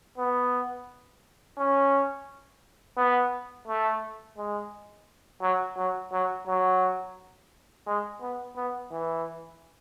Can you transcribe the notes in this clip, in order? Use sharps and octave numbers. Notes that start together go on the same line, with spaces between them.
B3
C#4
B3
A3
G#3
F#3
F#3
F#3
F#3
G#3
B3
B3
E3